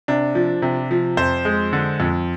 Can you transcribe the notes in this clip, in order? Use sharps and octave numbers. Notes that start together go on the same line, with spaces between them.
C3 D4
F3
C3
F3
F2 C5
G#3
D3
F2